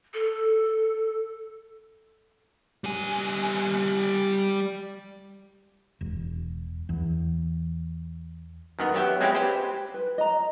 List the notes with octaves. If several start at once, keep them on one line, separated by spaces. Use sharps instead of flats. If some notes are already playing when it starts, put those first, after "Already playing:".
A4
G3 G#5
E1
E2
F#2 D#3 B3
F#3 B3 G4 E5 G5
G#3 C4 C#4 E4 G4
G4 B4 C5
B4
D#5 A#5